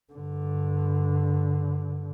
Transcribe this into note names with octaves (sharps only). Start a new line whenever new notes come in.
G2 D3